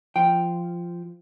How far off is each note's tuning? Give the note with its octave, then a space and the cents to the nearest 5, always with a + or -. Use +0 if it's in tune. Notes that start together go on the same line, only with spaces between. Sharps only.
F3 -10 G5 +0